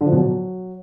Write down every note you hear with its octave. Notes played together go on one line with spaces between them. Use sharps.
D3
F3
B2
F#3